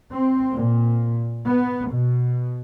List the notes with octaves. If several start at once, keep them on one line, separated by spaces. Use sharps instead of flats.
C4
A#2
B3
B2